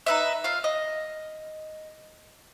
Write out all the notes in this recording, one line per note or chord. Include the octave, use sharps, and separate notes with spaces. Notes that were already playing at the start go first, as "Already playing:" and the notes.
D#4 B4 E5
F4 F5
D#5